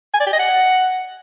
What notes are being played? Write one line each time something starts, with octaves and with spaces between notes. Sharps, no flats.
G#5
D5
G4
D#5
F#5